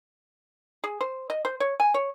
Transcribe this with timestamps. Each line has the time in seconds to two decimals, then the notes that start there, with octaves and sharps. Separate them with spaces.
0.84 G#4
1.01 C5
1.30 D#5
1.45 C5
1.60 C#5
1.80 G#5
1.94 C#5